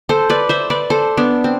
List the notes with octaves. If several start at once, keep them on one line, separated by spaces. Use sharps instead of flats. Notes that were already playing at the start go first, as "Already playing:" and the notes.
A4 C5
B4 D5
C5 E5
B4 D5
A4 C5
B3 D4
C4